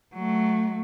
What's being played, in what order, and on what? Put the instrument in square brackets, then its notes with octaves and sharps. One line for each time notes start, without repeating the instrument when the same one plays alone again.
[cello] F#3 A3